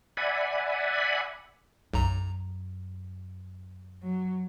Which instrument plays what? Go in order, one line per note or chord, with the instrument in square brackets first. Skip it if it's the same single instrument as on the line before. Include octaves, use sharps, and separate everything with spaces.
[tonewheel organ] D5 E5 F#5 G#5 B5
[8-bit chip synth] B1 A#5 [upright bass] F#2
[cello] F#3